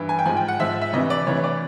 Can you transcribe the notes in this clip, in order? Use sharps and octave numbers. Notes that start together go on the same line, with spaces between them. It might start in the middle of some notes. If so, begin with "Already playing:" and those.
Already playing: G2 E3
G#5
G5
G#2 F3 G#5
G5
F#5
G#2 F3 E5
E5
D2 C3 E3 D#5
D5
D2 C3 E3 C#5
D5